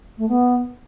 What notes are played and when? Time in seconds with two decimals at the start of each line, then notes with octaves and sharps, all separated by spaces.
0.18 A3
0.28 B3